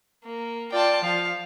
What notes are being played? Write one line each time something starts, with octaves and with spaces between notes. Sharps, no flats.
A#3
F4 D5 G5 A5
F3 F5